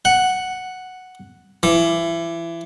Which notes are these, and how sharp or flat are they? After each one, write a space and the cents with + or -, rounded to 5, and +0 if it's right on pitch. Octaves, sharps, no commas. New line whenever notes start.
F#5 +0
E3 +25